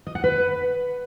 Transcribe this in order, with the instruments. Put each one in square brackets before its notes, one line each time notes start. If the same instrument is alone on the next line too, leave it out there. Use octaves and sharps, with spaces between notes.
[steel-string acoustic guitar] D#5
F#5
B4